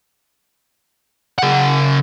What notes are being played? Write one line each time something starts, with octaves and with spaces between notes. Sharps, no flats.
C#3 F#5